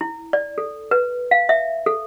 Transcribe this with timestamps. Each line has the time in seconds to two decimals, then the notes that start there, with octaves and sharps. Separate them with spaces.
0.01 E4
0.33 D5
0.58 A4
0.91 B4
1.31 F5
1.49 E5
1.86 A4